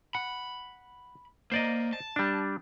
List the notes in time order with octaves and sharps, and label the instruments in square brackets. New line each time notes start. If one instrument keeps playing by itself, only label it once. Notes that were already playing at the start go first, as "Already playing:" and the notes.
[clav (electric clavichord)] F#5 [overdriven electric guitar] B5
[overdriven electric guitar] A#3 [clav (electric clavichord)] C5 D5 D#5
[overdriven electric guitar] A5
[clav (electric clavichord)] G3 D4